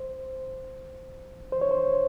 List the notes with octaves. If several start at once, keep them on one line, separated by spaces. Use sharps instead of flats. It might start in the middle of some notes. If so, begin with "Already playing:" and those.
Already playing: C5
C5
C#5
C5